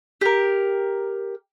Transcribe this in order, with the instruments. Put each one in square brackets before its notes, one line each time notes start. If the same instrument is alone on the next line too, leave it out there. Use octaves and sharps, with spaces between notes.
[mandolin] G4 A#4